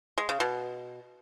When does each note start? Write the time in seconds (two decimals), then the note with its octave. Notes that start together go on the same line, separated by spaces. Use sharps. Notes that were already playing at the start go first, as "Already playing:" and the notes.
0.18 G#3
0.29 C#3
0.40 B2